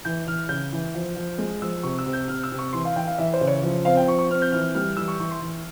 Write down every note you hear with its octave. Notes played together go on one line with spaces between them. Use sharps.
E3 G6
E3 F6
C#3 G6
E3
F3
F3
G#3
F3 E6
C3 C#6
E6
C3
G6
C3 F6
E6
C3
C#6
E3 C6
F5
E3 G5
F5
E3 E5
C5
C#3
C#5
F3
C4 F5
G5
F3 C#6
C#6
C4 F6
G6
E3 F6
G3 F6
E3 E6
C#6
E3 C#6
C6
E3